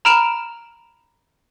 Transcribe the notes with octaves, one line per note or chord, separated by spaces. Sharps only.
A#5 B5 F6 D7 E7 F7